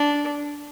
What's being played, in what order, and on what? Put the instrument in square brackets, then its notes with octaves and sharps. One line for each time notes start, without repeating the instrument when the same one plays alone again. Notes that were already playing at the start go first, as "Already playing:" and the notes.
Already playing: [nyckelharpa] D4